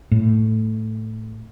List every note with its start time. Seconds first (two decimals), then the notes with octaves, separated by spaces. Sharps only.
0.11 A2